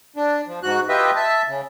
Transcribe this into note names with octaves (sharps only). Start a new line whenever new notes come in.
D4
F3
G#2 F#4 F#6
F4 G4 B4 D#5 E5
E5 A5
C#3